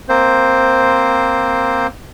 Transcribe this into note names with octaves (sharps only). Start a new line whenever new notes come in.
A#3 C4 C5